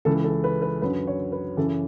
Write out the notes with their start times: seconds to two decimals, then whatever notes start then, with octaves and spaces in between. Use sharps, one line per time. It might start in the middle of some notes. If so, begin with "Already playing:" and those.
0.05 C#2 C#3 E3 A4
0.24 A4
0.44 B4
0.62 B4
0.82 F#2 D3 F#3 B4
1.07 C#5
1.32 B4
1.57 F#2 C#3 E3 A4